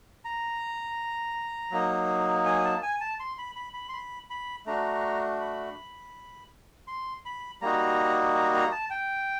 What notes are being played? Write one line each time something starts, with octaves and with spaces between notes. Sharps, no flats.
A#5
F#3 A#3 D#4
G#5
A5
G#5
A5
C6
B5
B5
B5
C6
B5
B5
A3 D4 F#4 A#5
B5
C6
B5
G3 A#3 D#4 F#4 A#5
A#5
A#5
A5
G5